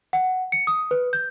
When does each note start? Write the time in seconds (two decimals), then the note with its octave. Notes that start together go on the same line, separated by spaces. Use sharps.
0.13 F#5
0.52 C#7
0.67 D#6
0.91 B4
1.13 G6